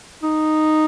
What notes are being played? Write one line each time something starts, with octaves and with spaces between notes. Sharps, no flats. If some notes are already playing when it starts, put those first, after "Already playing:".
D#4